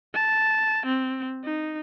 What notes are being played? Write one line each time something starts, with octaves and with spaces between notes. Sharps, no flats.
A5
C4
D#4